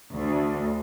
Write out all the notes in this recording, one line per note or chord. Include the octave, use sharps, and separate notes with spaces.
D2